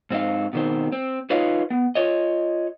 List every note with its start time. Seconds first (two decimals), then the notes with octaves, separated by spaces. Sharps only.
0.11 G#2 C4 D#4 F5
0.53 B2 D#3 C4
0.92 C4
1.30 D#4 F4 B4 C#5 D#5 F5
1.70 B3
1.95 F4 C#5 D#5